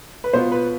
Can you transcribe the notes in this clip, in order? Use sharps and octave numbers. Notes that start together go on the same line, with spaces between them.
B4
B2 B3 F4 C5
B4